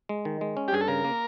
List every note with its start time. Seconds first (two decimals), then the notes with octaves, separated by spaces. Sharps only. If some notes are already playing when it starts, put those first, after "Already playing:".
0.09 G#3
0.25 D#3
0.41 G#3
0.57 C#4
0.68 G4
0.73 G2 G#4
0.81 A4
0.88 C#3 A#4
1.04 A#3